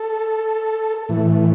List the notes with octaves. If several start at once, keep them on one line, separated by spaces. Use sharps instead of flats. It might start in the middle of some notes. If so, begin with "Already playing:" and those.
Already playing: A4
A2 E3